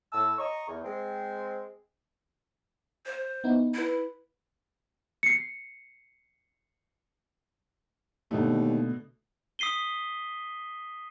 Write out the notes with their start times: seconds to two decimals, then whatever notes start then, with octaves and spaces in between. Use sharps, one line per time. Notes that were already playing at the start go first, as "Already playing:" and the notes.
0.13 A2 A5 E6
0.39 D#5 A#5 C#6
0.68 E2
0.84 G#3 C4
3.06 C5
3.44 B3 D#4 E4
3.74 E4 B4 B5
5.23 C7 C#7
8.31 D#2 B2 D3 A3
9.59 D#6 B6 C7 D#7 G7